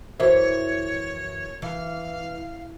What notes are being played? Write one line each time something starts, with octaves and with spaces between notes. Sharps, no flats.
F#2 E3 F#4 A#4 C5 C#5 E5
E3 F5